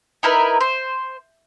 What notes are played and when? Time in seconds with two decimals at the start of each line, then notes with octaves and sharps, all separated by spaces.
0.23 D#4 E4 A#4 B4
0.61 C5